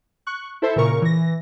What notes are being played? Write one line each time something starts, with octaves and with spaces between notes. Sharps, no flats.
C#6 F#6
E4 A4 C5 E5
A#2 C#3 A#4 C#6
E3 A#6